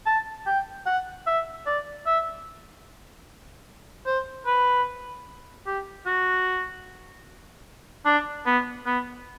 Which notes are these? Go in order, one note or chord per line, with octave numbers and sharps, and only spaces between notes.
A5
G5
F#5
E5
D5
E5
C5
B4
G4
F#4
D4
B3
B3